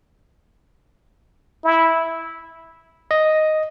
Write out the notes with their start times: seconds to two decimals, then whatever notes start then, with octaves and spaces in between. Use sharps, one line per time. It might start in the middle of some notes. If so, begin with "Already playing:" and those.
1.64 E4
3.11 D#5